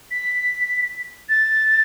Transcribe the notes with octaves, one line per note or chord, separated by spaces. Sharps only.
B6
A6